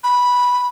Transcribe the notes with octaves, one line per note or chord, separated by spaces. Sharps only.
B5